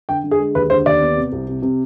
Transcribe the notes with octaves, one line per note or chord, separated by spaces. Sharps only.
D3 G5
D3
G#4
G#3
D#2 B4
D3 C5
D#2 D5
B3
C3
C2
C3
C3